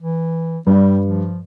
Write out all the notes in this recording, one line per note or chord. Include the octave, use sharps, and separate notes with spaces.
E3
G2 G3
F3